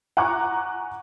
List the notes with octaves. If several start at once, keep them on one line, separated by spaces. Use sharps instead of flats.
F#5 G#5 A#5 C#6 D6 F#6